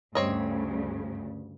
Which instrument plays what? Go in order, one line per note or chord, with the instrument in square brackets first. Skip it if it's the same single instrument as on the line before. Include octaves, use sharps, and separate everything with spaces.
[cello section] D2 G2 C#3 [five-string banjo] C4 C#5 D#5